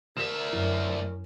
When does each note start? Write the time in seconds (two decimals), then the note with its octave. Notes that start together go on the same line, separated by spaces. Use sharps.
0.17 D2 A#4 E5 E7
0.52 F#2 E4